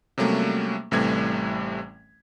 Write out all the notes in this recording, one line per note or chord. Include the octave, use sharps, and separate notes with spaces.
C3 F#3 G3 A3 A#3 C#4
A1 C3 E3 G3 A3 G#6